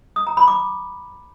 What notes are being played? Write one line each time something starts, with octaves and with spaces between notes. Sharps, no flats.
D#6
A#5
B5
D6